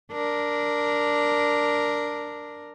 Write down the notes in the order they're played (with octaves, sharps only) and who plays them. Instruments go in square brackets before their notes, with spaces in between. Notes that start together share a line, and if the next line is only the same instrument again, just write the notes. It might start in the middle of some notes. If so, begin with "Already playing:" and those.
[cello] D4 A#4